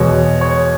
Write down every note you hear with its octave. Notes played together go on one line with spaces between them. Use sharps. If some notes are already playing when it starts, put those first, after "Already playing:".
Already playing: E2 B2 G#3 C#5
C#5